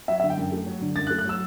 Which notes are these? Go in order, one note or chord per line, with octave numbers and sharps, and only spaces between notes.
F#3 E5
D3 E5
G5
F#2
A3
F#3
D3
F#2 A6
F#6
A3
F#6
F#3 E6